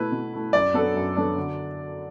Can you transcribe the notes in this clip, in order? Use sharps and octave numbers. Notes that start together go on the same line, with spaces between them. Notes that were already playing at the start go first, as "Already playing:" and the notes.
Already playing: B2 A3 E4 B4
B2
A3 E4
F#2 D5
F#3 B3 D4 A4
F#2
F#3 B3 D4 A4
D3